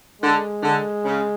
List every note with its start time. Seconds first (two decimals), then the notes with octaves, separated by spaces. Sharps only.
0.21 D3 G#3
0.63 D3
1.05 C#3